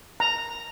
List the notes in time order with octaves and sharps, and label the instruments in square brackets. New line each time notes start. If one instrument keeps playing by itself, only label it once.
[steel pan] A#5